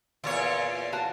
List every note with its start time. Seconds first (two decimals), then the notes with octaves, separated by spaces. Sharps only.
0.24 E2 A#2 F4 C#5
0.93 F#4 F5 A5